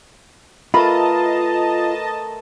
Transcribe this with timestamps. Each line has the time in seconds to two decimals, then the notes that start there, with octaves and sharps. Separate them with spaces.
0.74 A3 F4 A#4 B4 D#5 A5 B5